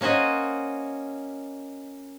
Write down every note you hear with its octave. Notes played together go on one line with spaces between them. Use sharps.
A#3 C#4 F#4 C5 D#5